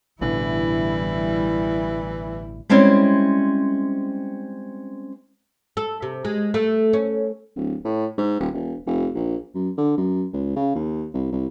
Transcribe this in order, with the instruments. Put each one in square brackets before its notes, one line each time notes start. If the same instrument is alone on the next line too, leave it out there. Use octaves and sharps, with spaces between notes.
[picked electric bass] A1 B2 D3 [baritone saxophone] E3 [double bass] G3 E4
[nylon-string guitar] G3 G#3 C4 C#4 E4
[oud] A4
C3
G#3
A3
C#4
[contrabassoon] D1
A2
G#2
D#1
E1
F1
A#1
F#2
D3
F#2
C#2
C#3
D#2
C2
C2